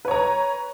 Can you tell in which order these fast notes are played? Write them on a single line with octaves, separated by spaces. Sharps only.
B4 C#5 A#5